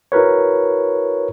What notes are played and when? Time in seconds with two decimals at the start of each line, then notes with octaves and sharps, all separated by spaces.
0.12 E4 F#4 A#4 B4 C#5